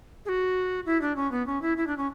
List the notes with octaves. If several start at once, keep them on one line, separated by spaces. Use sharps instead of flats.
G#4
F#4
E4
D4
C#4
B3
C#4
E4
E4
D4
C#4